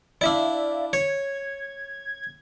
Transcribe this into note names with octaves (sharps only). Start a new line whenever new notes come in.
D4 E4 D5 E5 F5
C#5 G#6